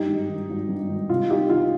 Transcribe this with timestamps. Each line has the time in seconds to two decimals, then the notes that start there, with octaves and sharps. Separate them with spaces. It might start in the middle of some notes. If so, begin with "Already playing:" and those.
Already playing: G2 D#4 G4
0.08 G#1
0.29 D#3
0.50 G#1
0.69 G2
0.89 G#1
1.09 C3 F4
1.30 C#2 D#4 G4
1.50 D#3 F4